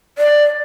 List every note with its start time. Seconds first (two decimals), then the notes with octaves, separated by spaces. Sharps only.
0.18 D5